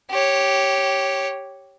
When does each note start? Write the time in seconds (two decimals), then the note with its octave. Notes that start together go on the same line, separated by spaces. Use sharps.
0.11 G4 C#5